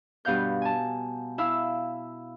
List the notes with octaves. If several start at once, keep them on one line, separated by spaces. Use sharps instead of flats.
G2 B2 F5 G6
G#5 A5
E4 F5 E6